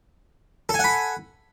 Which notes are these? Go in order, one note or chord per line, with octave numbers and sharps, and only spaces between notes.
A4 F#5 G#5 B5